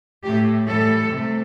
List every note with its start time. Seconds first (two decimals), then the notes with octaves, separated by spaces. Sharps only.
0.23 A2 A3 G4
0.66 A2 E3 G3 A4
1.10 C3 A3